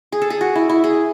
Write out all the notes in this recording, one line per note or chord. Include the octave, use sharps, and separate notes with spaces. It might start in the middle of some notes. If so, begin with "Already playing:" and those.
G#4
A4
G#4
F#4
E4
E4
G#4